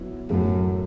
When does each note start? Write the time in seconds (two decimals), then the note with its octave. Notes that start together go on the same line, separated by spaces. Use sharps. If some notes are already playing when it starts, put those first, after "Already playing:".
Already playing: F#3 B3 E4
0.30 F#2 A2 F#3 A3